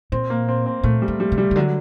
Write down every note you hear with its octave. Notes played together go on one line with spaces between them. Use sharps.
A#2 C4
A#3
C4
C4
A#2 A3
G3
A2
G3
C3
G3
C3
D3 F#3